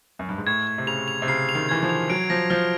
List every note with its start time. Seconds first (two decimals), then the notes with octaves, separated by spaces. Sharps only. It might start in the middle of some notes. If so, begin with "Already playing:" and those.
0.19 F#2
0.29 G2
0.38 G#2
0.47 A2 G#6
0.67 G#6
0.78 C3
0.87 C#3 F7
1.08 F7
1.22 C3
1.28 C#3 C7
1.49 F7
1.55 D#3
1.69 E3 G#6
1.83 F3
1.89 F7
2.10 F#3 D7
2.30 F3 A#6
2.50 F3 F6